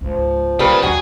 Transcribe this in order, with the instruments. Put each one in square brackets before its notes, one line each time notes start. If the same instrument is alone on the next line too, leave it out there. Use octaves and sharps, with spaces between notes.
[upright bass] C#2 G#2 [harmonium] F3
[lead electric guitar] C#3 [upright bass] F#3 [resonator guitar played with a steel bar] G3 A#3 B4
[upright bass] D#2 A#2 [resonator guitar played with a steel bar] F#3 F#4 [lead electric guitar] G#4